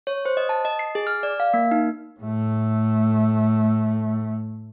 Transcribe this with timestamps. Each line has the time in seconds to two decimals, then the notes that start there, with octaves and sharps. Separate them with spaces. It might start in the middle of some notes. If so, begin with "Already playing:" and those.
0.07 C#5
0.25 C5
0.37 D#5
0.49 A5
0.65 D#5
0.79 C7
0.95 G#4
1.07 F6
1.23 D5
1.40 F5
1.54 A#3
1.71 D#4
2.20 A2 A3